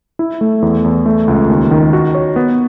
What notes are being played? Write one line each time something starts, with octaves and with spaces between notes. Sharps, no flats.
E4
A3
E2
E2
A3
C#2
D#2
D#3
F#4
C#5
B3